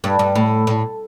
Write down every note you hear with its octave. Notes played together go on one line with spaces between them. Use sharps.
G2
G2
A2
A2